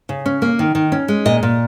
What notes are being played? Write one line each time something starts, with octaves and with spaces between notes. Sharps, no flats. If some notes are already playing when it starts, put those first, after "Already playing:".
C#3
C#4
A#3
D#3
D#3
C#4
G#3
A#2 D#5
A#2